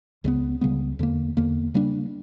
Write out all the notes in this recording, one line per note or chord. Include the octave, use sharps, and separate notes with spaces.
C#2 C#3 G3 B3
C#2 C#3 G3 B3
E2 D3 A#3
E2 D3 A#3
C#3 G3 A#3 D4